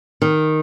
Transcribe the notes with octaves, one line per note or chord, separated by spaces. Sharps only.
D#3